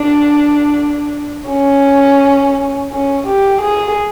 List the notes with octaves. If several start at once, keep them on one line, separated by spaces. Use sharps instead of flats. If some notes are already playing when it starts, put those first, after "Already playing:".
Already playing: D4
C#4
C#4
G4
G#4